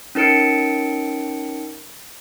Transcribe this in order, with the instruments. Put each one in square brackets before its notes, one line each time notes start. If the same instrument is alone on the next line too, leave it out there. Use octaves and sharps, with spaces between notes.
[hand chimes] C#4 D#4 A#4 C#7 D7